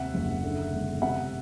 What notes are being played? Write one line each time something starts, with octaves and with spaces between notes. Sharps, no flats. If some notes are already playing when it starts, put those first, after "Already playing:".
Already playing: D#2 C3 E5 F#5
F#1
D3
E1
C3 E5 F#5